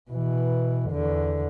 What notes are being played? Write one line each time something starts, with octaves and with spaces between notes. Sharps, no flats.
B2 E3
E2 D3